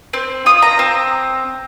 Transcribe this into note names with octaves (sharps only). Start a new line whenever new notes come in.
C4
F4 D#6
A#5
C4